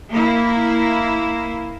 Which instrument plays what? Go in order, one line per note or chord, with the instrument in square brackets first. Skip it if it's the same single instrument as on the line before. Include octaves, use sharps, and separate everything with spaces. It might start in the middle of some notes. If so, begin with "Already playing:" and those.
[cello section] A#3 E4